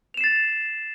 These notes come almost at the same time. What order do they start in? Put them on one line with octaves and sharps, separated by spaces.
F7 E7 C7 A6